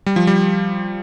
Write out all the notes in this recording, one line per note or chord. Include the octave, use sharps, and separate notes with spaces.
G3
F3
G3